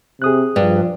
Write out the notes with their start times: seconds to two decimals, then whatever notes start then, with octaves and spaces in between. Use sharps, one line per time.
0.22 C3 G#4 D#6 F#6
0.56 G2 F3